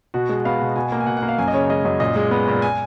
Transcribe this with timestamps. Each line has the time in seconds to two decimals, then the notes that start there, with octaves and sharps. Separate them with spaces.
0.14 B2 F#4
0.29 G#3
0.45 B3 F5
0.61 B2
0.76 B2 G#5
0.92 A#3
1.00 G#5
1.07 B2 F#5
1.17 F#5
1.22 A#3
1.28 F5
1.38 F#2 G#5
1.48 D#5
1.54 C#3 C#5
1.70 G#3 D#5
1.85 F#2 D#5
2.00 A#2 D#5
2.16 G#3
2.31 B3
2.48 A#2
2.62 G#5